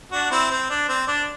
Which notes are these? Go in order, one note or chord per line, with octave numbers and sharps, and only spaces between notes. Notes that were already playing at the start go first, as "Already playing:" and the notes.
D4 F#4
C4 E4
C4
D4
C4
D4